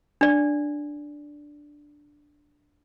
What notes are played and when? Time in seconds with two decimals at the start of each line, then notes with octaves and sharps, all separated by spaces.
0.21 D4 D5